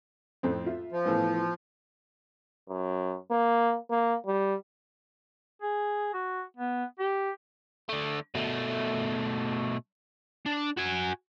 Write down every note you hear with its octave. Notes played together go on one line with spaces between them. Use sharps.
F2 A2 C4
F4 E5
F3
A2 E3 B3
F#2
A#3
A#3
G3
G#4
F#4
B3
G4
D3 A3
B2 A3
D4
F#4 G#5